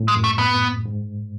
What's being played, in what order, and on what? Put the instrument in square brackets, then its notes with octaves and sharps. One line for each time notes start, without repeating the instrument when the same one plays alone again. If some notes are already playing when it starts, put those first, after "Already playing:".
Already playing: [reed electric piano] A2
[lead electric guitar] G#3
[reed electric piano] F#2
[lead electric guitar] A3
B3
[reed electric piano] G#2